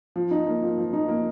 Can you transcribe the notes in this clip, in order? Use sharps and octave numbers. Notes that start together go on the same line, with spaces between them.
F3
D#4
A#3
F3
F3
D#4
A#3